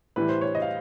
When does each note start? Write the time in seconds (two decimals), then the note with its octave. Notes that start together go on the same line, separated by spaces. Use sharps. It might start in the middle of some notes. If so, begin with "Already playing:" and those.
0.16 A2 E3 G3 B4
0.29 C5
0.41 C#5
0.55 D#5
0.62 F5